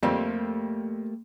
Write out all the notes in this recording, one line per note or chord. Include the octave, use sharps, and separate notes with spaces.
F2 G3 A3 A#3 C4 G4